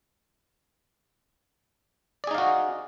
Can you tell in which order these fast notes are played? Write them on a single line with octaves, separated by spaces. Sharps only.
D5 G#4 D#4 F5 F#4